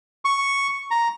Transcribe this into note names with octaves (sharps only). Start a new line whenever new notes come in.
C#6
A#5